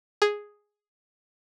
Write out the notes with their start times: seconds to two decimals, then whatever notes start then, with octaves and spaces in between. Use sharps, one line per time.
0.22 G#4